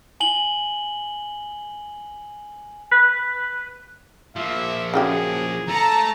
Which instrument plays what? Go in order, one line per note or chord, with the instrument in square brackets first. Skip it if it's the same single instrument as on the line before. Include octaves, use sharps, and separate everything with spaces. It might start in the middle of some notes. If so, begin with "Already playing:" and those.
[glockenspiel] G#5 F#7 G7
[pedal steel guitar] B4
[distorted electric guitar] F3 A#3 [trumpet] E5
[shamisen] C#3 F#3 G4 [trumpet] G#4
[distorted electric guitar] A3 [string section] A5 A#5